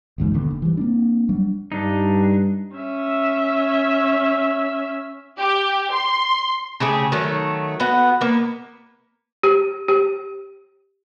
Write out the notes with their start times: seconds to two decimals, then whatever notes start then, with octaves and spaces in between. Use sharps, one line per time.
0.18 G1 E2 G#2 B2
0.34 D#2 B2 D3
0.51 F1
0.62 E3 G3
0.77 A#3 C4 D4
1.29 F#3 G3 D4
1.72 G2 G3 D4 D#4
2.76 C#4 E5
5.38 G4
5.93 C6
6.80 C#3 A3 G4 G#4
7.12 D#3 F#3 A3
7.80 B3 F#4 F#5
8.21 A#3 B3
9.43 G4
9.88 G4